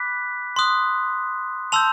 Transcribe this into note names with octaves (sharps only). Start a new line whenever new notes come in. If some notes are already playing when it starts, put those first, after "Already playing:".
Already playing: B5 D6 F#6 B6
C6 D#6 F#6
A5 C6 E6 G6 F7